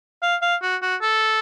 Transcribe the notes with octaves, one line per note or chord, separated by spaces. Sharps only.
F5
F5
F#4
F#4
A4